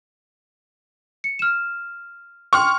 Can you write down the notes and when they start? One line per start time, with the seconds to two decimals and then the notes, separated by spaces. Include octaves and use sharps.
1.24 C#7
1.39 F6 E7
2.53 G5 C6 C#6 F6